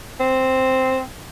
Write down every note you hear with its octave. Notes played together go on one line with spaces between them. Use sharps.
C4